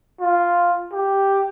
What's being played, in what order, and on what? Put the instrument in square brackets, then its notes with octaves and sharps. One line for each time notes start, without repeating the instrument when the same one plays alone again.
[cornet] F4
G4